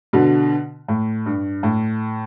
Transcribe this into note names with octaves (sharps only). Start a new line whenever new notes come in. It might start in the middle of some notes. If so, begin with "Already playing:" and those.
B2 D3
A2
G2
A2